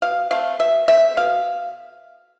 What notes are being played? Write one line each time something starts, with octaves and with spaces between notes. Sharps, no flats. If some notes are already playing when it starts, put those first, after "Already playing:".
B2 F5
A3 C4 F5
B2 E5
A3 C4 E5
B2 F5